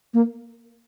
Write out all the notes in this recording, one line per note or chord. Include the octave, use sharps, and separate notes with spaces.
A#3